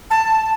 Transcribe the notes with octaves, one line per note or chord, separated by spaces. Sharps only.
A5